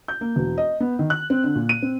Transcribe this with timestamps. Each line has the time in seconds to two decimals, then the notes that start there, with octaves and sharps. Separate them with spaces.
0.08 G6
0.21 A#3
0.36 E1
0.58 D#5
0.80 B3
0.99 D#3
1.10 F#6
1.30 C4
1.44 D3
1.55 A#2
1.69 D#7
1.82 C4